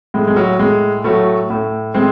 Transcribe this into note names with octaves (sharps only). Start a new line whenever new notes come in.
A2 G#3
G#3
F#3
A2 G#3
A2 F#3 A3
A2
A2 G#3 C4